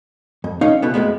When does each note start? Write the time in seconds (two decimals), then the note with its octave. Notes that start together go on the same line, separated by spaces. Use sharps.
0.44 F2
0.61 D#2 C#4 D#4 F5
0.82 C2 B2 B3
0.94 F2 A2 G#3 B3